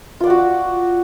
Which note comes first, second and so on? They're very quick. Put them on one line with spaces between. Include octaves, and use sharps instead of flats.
F4 D5 F#5 F#4